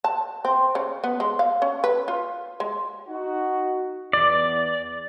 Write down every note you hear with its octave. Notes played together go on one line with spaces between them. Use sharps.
A5
C4
C#3
B3
G#3
F5
C#4
B4
F4
G#3
D#4 F#4
E2 D5